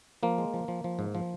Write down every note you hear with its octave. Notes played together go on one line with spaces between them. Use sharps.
F3 A#3
G#3
F3
F3
F3
G#2
F3